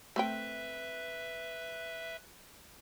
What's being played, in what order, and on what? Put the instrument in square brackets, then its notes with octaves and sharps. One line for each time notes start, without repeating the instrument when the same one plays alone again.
[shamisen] A3 C4 G5 [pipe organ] B4 E5